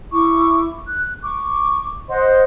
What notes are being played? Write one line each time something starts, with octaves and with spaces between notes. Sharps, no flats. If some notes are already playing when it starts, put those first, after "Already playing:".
E4 C#6 D6
F#6
C#6 D6
C5 D#5 F#5 C6